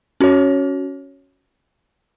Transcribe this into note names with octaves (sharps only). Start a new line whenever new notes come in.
C#4 F#4 C#5